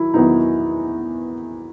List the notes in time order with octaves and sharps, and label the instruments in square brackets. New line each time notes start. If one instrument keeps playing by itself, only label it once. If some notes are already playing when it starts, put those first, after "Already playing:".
Already playing: [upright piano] D#3 F#3 [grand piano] E4
[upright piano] E2 D#3 F#3 B3 D#4 [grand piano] E4